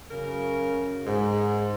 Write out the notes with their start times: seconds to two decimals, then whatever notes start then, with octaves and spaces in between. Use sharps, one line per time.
0.11 F#2 C#3 A#4
1.06 G#2